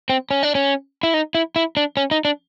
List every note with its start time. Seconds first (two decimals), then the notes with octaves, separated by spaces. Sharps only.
0.10 C4
0.31 C#4
0.43 D4
0.55 C#4
1.03 E4
1.14 D#4
1.35 E4
1.56 E4
1.77 D4
1.97 C#4
2.11 D#4
2.25 D4